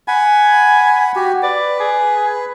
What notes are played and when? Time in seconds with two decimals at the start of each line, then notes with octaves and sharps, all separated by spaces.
0.08 F#5 G#5 B5
1.16 F#4 G4
1.43 B4 D5
1.80 G#4